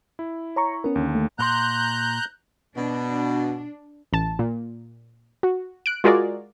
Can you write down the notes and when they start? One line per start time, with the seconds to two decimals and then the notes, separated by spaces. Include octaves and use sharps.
0.19 E4
0.56 C#5 A#5 C#6
0.84 B3 C#4 A#4
0.95 D#2 D3
1.15 A3
1.39 A#2 A#4 A#5 C6 F#6 G6
2.76 B2 D4
4.13 A1 A5
4.39 A#2
5.43 F#4
5.86 F#6 D7
6.04 G#3 F4 F#4 G#4 A#4 D5